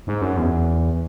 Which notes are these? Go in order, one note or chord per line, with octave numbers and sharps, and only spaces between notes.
G#2
F#2
E2